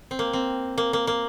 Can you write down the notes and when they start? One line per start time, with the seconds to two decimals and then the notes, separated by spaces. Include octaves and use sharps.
0.11 C4
0.19 A#3
0.33 C4
0.78 A#3
0.93 A#3
1.07 A#3